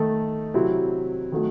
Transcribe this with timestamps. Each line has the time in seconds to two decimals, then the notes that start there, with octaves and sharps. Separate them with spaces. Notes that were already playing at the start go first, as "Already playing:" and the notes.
Already playing: D#3 A3 D#4 A4
0.54 C3 F#3 C4 E4
1.32 D#3 F#3 A3